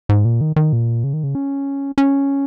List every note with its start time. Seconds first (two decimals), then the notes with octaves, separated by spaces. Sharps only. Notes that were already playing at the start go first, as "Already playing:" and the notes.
0.09 G#2
0.25 A#2
0.41 D#3
0.56 D#3
0.73 A#2
1.04 C#3
1.13 D#3
1.23 C#3
1.35 C#4
1.98 C#4